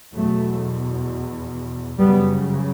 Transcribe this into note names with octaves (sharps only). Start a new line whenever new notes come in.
E2 B2 F#3 A3
F#2 C#3 G3 B3